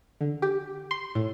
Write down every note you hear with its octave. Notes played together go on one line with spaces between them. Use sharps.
D3
G4
C6
A2